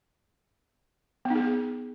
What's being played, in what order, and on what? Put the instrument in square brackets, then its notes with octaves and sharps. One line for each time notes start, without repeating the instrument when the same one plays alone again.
[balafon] B3
D#4
G#4
B3